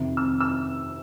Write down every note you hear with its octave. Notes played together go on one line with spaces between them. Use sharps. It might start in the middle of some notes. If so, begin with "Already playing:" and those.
Already playing: F2 C3 D#3
E6
E6